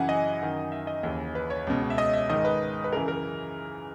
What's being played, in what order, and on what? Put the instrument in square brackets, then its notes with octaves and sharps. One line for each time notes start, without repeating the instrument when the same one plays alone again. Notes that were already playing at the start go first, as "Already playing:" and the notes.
Already playing: [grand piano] F#2 C#3 E3 F#5 G#5
D#5
F#2 D#3
E5
D#5
D#2 C#3 E3
B4
C#5
C#2 B2
E5
D#5
E5
G#2 D#3 D#5
B4
B4
F#2 C#3 E3 A#4
A#4